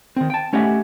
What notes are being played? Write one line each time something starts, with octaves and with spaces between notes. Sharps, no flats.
D#3 C4
G5 A5
A3 C#4 G4 D#5 E5 F#5